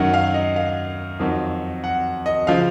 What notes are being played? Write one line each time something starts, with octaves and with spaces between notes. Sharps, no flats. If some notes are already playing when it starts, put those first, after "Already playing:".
Already playing: F#2 D#3 F#3 F#5
F5
D#5
F5
F2 D#3 F#3
F#5
D#5
C#3 F3 F5